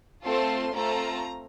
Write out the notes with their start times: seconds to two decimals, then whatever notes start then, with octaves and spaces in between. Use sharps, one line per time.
0.24 A3 C4 F4 A4 C6
0.74 A3 C4 F4 A4 A#5